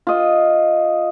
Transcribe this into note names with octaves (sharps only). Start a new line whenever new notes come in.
F4 D#5